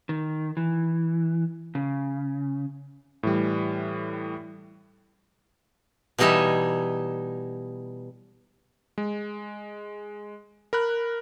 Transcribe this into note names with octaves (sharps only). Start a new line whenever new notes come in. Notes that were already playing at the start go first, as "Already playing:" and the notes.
D#3
E3
C#3
A2 E3 G3
B2 E3 G3 D#4 C#5 E5
G#3
A#4 B5 F#6